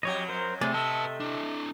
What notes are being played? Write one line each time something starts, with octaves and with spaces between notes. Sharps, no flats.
F2 F#3 G4 C#5 D#5
A#4 C5
C3 A3 C4 G#4 D5
A3 B4 D#5 E5 A5
D4 E4